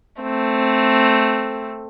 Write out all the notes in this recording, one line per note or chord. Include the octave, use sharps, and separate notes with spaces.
A3 C4